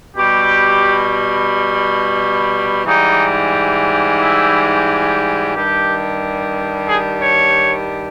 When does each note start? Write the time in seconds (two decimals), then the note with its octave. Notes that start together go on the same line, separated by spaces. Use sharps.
0.17 B2 G3 G4
2.85 G#2 E3 G3 D#4
4.20 E4
5.54 G2 D#3 G3 G4
6.88 G#4
7.22 C#5